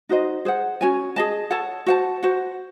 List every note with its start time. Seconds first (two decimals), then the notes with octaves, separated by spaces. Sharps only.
0.09 D#4 F#4 C5 D#5
0.45 G#4 C5 F#5
0.81 C#4 F#4 C#5 G#5
1.16 G#4 D#5 A5
1.51 A4 C#5 F#5 A5
1.86 F#4 C5 F#5 A5
2.23 F#4 C5 F#5